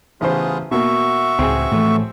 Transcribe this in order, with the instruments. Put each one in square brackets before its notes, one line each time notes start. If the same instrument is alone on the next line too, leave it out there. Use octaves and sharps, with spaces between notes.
[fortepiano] A1 C#3 C5 [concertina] B3 F4 G#4
[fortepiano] B2 A#3 [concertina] F#4 E5 C#6
[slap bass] C#2 A2 [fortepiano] C4 G#4
[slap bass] A2 E3 F3 [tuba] A3